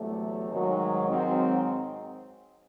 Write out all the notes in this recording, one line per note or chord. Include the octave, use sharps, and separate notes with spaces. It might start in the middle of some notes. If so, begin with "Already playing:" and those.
Already playing: E2 C3 F#3 A3
G#2 D#3 F#3
G#2 D#3 F#3 C4